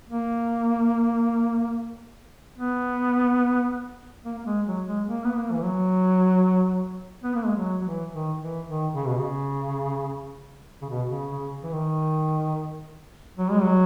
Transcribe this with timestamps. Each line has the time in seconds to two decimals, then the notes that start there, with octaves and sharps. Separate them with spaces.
0.10 A#3
2.59 B3
4.25 A#3
4.38 A#3
4.46 G#3
4.66 F#3
4.87 G#3
5.08 A#3
5.24 B3
5.36 A#3
5.52 E3
5.63 F#3
7.23 B3
7.35 A#3
7.46 G#3
7.57 F#3
7.81 F#3
7.85 E3
8.12 D#3
8.41 E3
8.67 D#3
8.95 C#3
9.07 B2
9.19 C#3
10.82 C#3
10.89 B2
11.10 C#3
11.30 C#3
11.63 E3
11.72 D#3
13.37 F#3
13.51 G#3
13.62 F#3